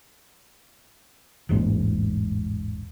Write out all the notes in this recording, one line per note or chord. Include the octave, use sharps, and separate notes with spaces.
E1 A1 G#2 A#3